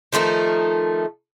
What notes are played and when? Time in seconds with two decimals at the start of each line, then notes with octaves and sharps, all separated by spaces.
0.13 D#3 F3 A3 D#4